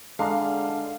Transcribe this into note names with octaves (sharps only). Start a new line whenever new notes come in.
D3 G#3 D4 F5 A#5